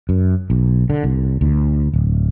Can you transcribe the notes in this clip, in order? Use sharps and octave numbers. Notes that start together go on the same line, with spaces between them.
F#2
B1
D3
C2
D2
D1